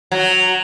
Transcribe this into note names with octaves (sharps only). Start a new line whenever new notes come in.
F#3